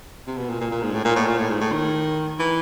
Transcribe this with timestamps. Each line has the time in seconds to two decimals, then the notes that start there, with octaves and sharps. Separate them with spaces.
0.27 C3
0.37 B2
0.49 A#2
0.60 A#2
0.71 A#2
0.82 G#2
0.93 A2
1.05 A#2
1.16 A2
1.27 A#2
1.38 A2
1.50 G#2
1.61 A2
1.72 D#3
2.39 E3